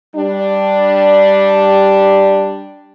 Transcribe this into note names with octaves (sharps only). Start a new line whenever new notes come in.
G3 D4